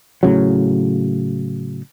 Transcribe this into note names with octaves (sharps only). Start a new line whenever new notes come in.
A2 C#3 F#3